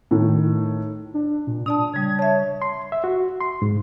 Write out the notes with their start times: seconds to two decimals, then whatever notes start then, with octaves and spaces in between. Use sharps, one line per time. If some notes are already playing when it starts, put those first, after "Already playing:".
0.11 A2 D#3
1.14 D4
1.47 A#2
1.66 D4 D5 A5 D#6
1.94 C#3 G3 G#6
2.19 C#5 E5 A5
2.62 C6
2.92 E5
3.04 F#4
3.41 C6
3.62 G#2